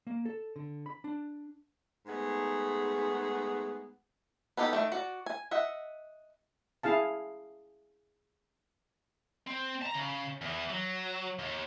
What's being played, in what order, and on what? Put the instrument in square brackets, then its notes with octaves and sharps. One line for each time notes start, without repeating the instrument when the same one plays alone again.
[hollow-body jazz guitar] A#3
A4
D3
B5
D4
[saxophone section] G#2 A3 B3 G#4
[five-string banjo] B3 D4 D#4 G4 A4
D#3 G#3 A3
F#4 D5
G#5
D#5 E5 F#5
[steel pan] E4 G#4 F5 A5
[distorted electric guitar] C4
A5 A#5
C#3
E2 E3
F#3
D#2